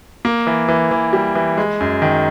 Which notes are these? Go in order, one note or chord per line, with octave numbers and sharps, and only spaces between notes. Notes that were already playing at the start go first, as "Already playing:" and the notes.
A#3
E3
E3
E3
G3
E3
G#3
F#2
D#3